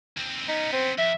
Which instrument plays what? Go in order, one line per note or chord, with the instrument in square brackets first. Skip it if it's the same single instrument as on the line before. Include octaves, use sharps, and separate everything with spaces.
[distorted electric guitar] D#2 C4
[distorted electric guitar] B3 C#4 [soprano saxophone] D#4
[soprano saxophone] C4
[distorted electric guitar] F2 [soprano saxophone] E5